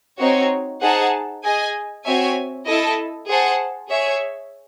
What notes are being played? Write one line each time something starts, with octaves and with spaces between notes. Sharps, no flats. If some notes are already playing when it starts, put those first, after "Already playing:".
C4 D#4 F#4 C#5
D#4 G#4 C5 F#5 A5
G#4 D#5 G#5
C4 F#4 C#5 E5 G#5
E4 A4 D#5 A5
G#4 C5 F#5 A5
G#4 C#5 E5